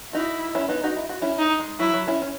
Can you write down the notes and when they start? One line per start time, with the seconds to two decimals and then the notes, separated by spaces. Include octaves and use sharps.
0.13 D#4 E4 F#4
0.55 C#4 E4
0.69 B3 D#4
0.84 D#4 F#4
0.97 E4
1.09 F#4
1.22 C#4 E4
1.39 D#4
1.59 G#3
1.80 F#3 E4
1.93 F#3
2.07 C#4 E4
2.22 C#4